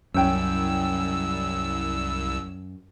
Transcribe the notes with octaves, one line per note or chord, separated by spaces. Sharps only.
C2 F#2 C#4 G5 E6